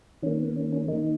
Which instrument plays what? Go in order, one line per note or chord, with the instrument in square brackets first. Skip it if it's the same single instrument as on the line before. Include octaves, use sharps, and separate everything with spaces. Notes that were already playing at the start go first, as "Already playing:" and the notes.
[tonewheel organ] D#3 C#4
A#3
B3
C#4
C#4
D#3 A#3 D#4